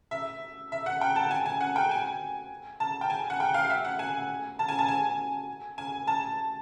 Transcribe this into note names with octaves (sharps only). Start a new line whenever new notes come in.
E5
E5
F#5
G5
A5
G#5
G#5
F#5
G5
G#5
A5
G5
G#5
F#5
G5
F5
E5
F#5
G#5
A5
G#5
A5
G#5
G#5
A5